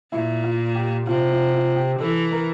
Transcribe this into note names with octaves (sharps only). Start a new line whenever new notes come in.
A#2 E4
F4
G4
C3 F4
F4
F4
G4
E3 A4
A#4